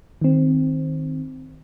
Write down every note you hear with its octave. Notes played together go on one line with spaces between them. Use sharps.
D#3 C4